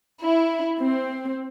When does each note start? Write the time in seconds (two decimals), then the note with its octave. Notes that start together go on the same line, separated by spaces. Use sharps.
0.21 E4
0.81 C4